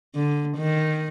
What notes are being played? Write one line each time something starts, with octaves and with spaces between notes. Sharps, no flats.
D3
D#3